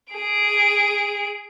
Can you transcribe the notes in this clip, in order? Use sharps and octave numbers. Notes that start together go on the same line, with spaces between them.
G#4 D7